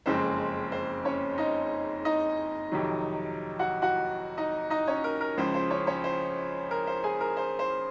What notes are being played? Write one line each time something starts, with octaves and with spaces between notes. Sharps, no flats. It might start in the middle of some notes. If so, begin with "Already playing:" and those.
F#1 F2 C#3 G#3 C4 C5
C5
C#4 C#5
D#4 D#5
D#4 D#5
F2 C3 D#3 F#3
F#4 F#5
F#4 F#5
D#4 D#5
D#4 D#5
C#4 C#5
A#4
A#4
C#2 C#3 F3 C5
C5
C#4 C#5
C#4 C#5
C5
A#4
C5
G#4 G#5
A#4
C5
C5